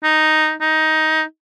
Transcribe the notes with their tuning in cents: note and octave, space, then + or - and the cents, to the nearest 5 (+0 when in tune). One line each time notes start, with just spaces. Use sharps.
D#4 -5
D#4 +15